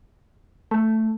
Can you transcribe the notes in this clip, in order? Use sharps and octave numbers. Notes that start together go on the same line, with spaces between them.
A3